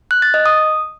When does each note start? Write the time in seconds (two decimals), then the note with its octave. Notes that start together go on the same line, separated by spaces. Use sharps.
0.11 F#6
0.22 A6
0.34 D#5
0.46 D#6